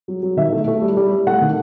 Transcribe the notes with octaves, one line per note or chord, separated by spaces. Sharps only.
F#3
F#3
D#3 E5
A3
A3
G3
G3
G3
A3 F#5
D#3